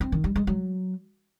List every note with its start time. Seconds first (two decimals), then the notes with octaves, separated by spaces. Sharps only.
0.01 C4
0.12 D#3
0.24 G3
0.36 G#3
0.47 F#3